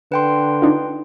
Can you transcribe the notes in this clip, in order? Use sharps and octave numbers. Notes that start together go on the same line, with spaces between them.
D3 B4 G5 C6
D4 D#4 F4